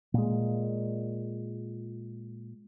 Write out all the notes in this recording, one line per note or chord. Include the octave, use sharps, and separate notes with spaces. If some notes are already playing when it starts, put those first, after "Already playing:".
A#2 G#3